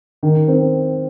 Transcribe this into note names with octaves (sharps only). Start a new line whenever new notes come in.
D#3
C4